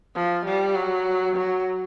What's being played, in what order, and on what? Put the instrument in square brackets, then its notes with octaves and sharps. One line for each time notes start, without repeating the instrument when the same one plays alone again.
[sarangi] F3
G3
F#3
F#3